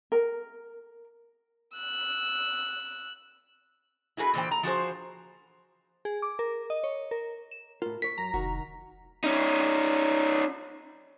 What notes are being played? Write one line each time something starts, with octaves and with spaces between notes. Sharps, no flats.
A#4
E6 F#6
E4 F#4 G#4 A#4 B4
A#2 E3 C5 G5
A#5
F3 F#4 G#4 C5
G#4
D6
A#4
D#5
C#5
A#4
E7
A2 F4 A#4
A#4 C#5 B6
F#2 A#5
F1 D#3 F#4
C#4 D#4